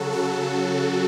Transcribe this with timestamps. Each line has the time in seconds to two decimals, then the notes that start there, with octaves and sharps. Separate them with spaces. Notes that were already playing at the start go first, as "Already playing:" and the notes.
Already playing: C#3 F#3 F#4 A4
0.13 F#4 A4